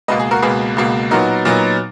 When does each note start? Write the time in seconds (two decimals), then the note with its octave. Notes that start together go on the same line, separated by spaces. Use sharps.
0.08 C#2 B2 A#3 B4 D#5
0.20 G#4
0.31 F#4 A#4
0.42 C#2 B2 A#3 G#4 B4
0.76 C#2 B2 A#3
1.11 A#2 F#3 B3 D#4 F#4 A#4
1.45 A#2 F#3 B3 D#4